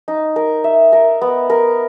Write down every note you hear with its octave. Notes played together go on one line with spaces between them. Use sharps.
D#4
A#4
E5
A#4
B3
A#4